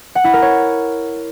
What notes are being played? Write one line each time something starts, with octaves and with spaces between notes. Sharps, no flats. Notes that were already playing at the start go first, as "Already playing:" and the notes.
F#5
E4
A#4
C#5